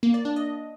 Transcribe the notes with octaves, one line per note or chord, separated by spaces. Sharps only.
A#3
D5
D4
D#5